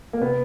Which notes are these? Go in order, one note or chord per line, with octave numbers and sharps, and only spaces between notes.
A#3
C3 B3